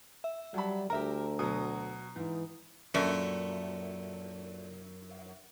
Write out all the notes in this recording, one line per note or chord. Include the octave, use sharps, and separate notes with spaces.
E5
F#3 G3 A5 B5
D2 G4 A#4 E5 A#5
B2 F#3 A#5 D#6
G#2 E3
F#2 A#2 A3